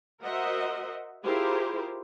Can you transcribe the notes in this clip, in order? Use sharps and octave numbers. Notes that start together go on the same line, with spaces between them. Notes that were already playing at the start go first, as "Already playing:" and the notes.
F#4 A#4 C5 D#5 E5 F#5
E4 F4 G4 G#4 A#4 C5